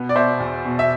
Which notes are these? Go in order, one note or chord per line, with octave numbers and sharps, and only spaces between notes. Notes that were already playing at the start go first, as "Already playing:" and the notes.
Already playing: B2 B3
D5
B2 C5 E5
E2
B2
E5